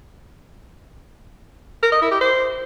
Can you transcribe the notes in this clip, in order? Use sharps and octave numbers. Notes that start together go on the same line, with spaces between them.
A#4
D#5
E4
G4
C5